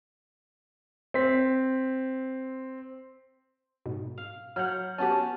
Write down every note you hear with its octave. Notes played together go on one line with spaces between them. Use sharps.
C4 B6
G#2 B2
F5
F#3 F#5 F6 G6
F#3 B3 C#4 F#4 G4 A5